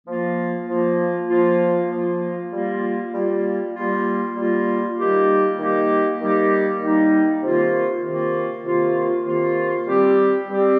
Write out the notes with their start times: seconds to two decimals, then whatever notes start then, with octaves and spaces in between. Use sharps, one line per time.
0.06 F3 A#3 F4
0.68 F3 A#3 F4
1.29 F3 A#3 F4
1.90 F3 A#3 F4
2.52 G3 A#3 F4
3.13 G3 A#3 F4
3.74 G3 A#3 F4
4.36 G3 A#3 F4
4.97 D#3 G3 A#3 D#4 G4
5.58 D#3 G3 A#3 D#4 G4
6.19 D#3 G3 A#3 D#4 G4
6.80 D#3 G3 A#3 D#4 G4
7.42 C3 D#3 A#3 F4
8.04 C3 D#3 A#3 F4
8.64 C3 D#3 A#3 F4
9.26 C3 D#3 A#3 F4
9.87 G3 C4 G4
10.48 G3 C4 G4